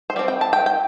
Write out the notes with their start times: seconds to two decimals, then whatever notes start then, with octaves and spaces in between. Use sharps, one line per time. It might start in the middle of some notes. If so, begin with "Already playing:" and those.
0.10 C5
0.16 G3 C4 D5
0.28 G5
0.41 A5
0.53 G5
0.66 G5